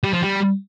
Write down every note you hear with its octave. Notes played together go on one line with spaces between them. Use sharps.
G3
F3
G3